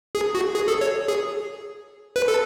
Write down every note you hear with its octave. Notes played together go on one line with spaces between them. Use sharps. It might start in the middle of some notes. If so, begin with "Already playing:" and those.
G#4
F#4
G#4
A4
C#5
G#4
B4
A4